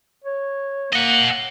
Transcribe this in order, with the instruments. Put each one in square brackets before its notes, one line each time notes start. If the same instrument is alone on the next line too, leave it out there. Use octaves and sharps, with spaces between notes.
[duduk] C#5
[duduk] A#3 [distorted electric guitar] D#5 F#5